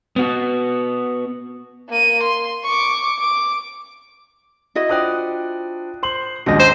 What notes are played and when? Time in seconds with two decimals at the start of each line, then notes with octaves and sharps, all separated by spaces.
0.16 B3 F#4
1.89 A#3 D#7
2.23 C6
2.64 C#6 D6
3.19 D6
4.75 E4 F#4 D#5
4.89 D4 F4 C5 G5 D#6 F#6
6.03 C5 C6 F#7
6.46 A#1 D#2 G#2 C#4 D4 F#4 D#5
6.60 C5 A#5 A#6 C7 D#7